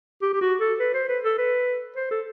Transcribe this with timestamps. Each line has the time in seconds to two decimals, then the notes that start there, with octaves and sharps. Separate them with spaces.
0.22 G4
0.33 G4
0.41 F#4
0.61 A4
0.80 B4
0.94 C5
1.09 B4
1.24 A4
1.38 B4
1.96 C5
2.11 A4